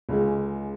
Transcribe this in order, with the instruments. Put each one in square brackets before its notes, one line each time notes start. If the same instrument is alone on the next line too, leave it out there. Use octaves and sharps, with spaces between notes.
[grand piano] C#2 C#3 G#3